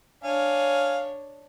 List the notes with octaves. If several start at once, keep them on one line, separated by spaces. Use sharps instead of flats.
D4 C#5 F5 G#5